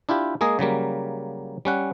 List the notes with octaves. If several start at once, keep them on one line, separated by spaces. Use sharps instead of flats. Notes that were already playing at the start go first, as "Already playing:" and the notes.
D4 E4 F4 G4
G#3 A#3 G#4 D#5
C#3 F#3 G3 A#3
G3 C#4 F#5